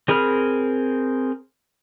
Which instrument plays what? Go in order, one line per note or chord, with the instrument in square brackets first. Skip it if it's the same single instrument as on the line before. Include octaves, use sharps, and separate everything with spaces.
[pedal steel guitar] C4 G#4 A#4 B5 F6